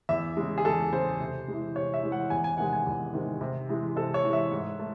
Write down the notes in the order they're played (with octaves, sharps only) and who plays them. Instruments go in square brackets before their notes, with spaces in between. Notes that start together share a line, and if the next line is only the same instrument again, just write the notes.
[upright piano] E2 E5
C#3 G#3
G#4
E2 A4
C#3 G#3 C5
C3
E3 G#3
C3 C#5
E5
E3 G#3
F#5
E2 G#5
G#5
C3 D#3 G#3 F#5
G#5
E2
C3 D#3 G#3
C3
E3 G#3
C3 A4
C#5
E3 G#3
E5
G#2
A3